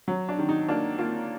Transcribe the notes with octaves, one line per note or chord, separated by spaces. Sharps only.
F#3
D4
D#3
D#4
A#3 D4
A#3 F4